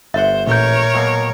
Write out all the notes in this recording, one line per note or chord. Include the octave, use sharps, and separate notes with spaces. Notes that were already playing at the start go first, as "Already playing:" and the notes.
G1 C5 E5 F#5
A1 A#2 A#4 C#5 G6
B2 F#3 A#3